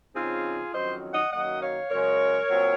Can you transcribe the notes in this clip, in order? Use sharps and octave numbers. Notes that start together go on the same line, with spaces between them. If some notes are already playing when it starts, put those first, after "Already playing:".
C#3 F3 C4 D#4 F4 G#4
F2 D#3 F#3 C#4 C5 D#5
D#5 F#5
F#2 D#3 F#3 A#3 D#5 F#5
C#5 F5
F#2 C#3 G#3 A#4 C#5
A#2 F#3 C4